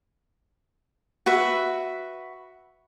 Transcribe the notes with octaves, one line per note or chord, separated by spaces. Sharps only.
F#4 B4 E5